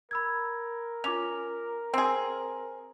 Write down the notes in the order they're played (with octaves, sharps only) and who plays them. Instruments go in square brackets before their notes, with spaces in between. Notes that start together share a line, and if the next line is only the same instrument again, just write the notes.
[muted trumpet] A#4 [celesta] B5 E6 G#6
[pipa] C#4 [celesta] F4 D6 F7
[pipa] C4 G#4 [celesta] C6